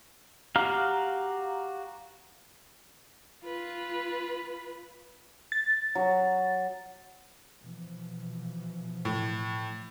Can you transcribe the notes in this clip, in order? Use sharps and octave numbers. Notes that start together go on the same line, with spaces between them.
F#4 G4 F5 A#5 F6
F4 B4
A6
F#3
B2 E3 F3
A2